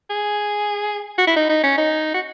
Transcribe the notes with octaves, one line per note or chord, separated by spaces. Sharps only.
G#4
F#4
E4
D#4
D#4
C#4
D#4
F#4